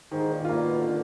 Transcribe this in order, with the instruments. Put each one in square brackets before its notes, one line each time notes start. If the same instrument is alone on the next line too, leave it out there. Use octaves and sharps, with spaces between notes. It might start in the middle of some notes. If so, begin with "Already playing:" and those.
[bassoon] G#2 [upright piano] D#3
[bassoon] A#2
[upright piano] A#3 F4
[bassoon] B2
D3